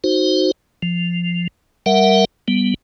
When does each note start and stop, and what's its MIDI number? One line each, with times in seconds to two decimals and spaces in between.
0.04 0.51 63
0.04 0.51 66
0.04 0.51 72
0.83 1.48 53
1.86 2.25 55
1.86 2.25 70
1.86 2.25 76
1.86 2.25 78
2.48 2.74 55
2.48 2.74 59